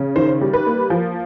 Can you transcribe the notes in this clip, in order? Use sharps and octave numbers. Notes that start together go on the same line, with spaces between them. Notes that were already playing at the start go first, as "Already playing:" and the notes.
Already playing: C#3
D#3 C5
G3
B4
A#3
F3